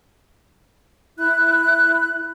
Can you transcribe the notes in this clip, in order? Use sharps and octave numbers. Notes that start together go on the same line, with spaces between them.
E4 F#6